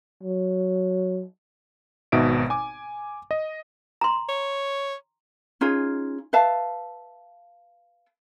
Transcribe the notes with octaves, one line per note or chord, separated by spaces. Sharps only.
F#3
G#1 B2 D#4 F#4 E5 D7
G#5 D6
D#5
A#5 C6
C#5
C#4 D#4 F4 G#4
B4 E5 F5 A5